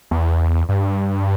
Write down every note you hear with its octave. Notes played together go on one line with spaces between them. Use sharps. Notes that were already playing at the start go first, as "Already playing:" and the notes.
E2
G2